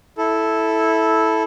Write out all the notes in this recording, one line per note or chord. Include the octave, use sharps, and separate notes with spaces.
E4 A4